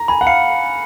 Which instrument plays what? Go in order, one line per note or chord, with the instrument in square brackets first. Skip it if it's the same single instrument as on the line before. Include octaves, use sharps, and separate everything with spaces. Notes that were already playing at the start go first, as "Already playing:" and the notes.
Already playing: [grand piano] A#5
[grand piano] G#5 [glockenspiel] B5
[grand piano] F#5
[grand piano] F5 [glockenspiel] C#7